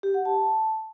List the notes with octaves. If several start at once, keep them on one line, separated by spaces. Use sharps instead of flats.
G4
F#5
A5